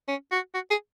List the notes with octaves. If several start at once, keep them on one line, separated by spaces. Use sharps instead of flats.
C#4
F#4
F#4
G#4